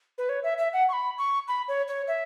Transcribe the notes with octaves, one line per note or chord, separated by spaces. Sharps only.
B4
C#5
E5
E5
F#5
C#6
B5
C#6
B5
C#5
C#5
E5